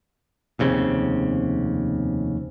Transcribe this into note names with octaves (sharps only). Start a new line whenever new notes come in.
F1 D#2 C#3 C4